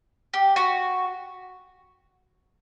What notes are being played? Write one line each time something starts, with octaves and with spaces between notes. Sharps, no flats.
G4
F#4